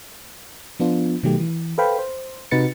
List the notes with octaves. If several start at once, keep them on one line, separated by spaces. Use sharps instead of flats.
F3 B3 D4 F4
B2 D#3 F#3 A3 G4
E3
A4 B4 C5 F5 G5 B5
C5
C3 D#4 F#4 B4 A6 C#7